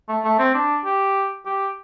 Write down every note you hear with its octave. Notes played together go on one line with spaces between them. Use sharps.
A3
A3
C4
D4
G4
G4